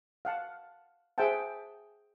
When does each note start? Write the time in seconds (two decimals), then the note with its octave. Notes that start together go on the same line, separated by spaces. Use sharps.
0.25 F5 F#5 A5
1.18 G#4 C5 E5 F#5 G5 A5